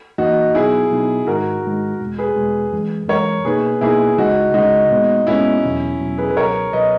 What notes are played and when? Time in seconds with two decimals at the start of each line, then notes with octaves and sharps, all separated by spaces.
0.18 F#2 E3 A#3 D#4 F#4
0.55 B2 F#3 B3 D#4 E4 G#4
0.91 B2 F#3 B3 D#4
1.27 G#2 D#3 G#3 D#4 F#4 A#4
1.63 G#2 D#3 G#3 D#4
2.00 E2 B2 G#3
2.19 G#4 B4
2.36 E2 B2 G#3
2.72 F#2 E3 G#3
3.09 F#2 E3 G#3 A#4 C#5
3.45 B2 A#3 D#4 G#4 B4
3.81 B2 A#3 D#4 E4 G#4
4.18 C#2 C#3 G#3 D#4 F#4
4.54 C#2 C#3 G#3 D#4 F#4
4.91 A#2 G#3 B3
5.27 A#2 G#3 B3 C#4 E4
5.64 E2 B2 F#3
6.01 E2 B2 F#3
6.18 G#4 B4
6.30 B4
6.37 C#2 B2 F#3 A#4 C#5
6.73 C#2 B2 F#3 B4 D#5